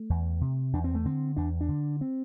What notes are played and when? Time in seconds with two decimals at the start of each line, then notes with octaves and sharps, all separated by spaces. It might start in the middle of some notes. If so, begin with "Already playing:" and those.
Already playing: A3
0.10 E2
0.41 C3
0.73 E2 D4
0.84 C4
0.95 A3
1.05 D3 C4
1.37 E2 D4
1.61 D4
1.69 D3
2.01 C4